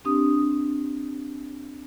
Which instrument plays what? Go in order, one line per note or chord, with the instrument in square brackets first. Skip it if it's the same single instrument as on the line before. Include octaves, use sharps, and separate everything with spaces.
[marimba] C4 D4 G4 D#6